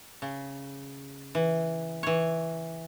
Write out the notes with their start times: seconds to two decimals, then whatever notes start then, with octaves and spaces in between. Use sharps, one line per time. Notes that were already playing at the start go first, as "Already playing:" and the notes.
0.22 C#3
1.35 E3
2.03 E3 C#5